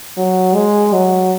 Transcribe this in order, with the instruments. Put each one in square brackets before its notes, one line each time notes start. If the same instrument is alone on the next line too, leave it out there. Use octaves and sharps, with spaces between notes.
[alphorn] F#3
G#3
F#3